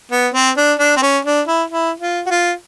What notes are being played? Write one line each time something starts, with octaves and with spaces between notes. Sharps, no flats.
B3
C4
D4
D4
C4
C#4
D4
E4
E4
F4
F#4
F4